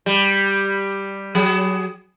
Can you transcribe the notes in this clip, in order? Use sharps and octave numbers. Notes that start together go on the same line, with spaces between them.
G3
F#3 G#4